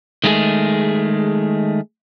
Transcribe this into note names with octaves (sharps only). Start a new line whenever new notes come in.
D#3 G#3 A3 E4 G#4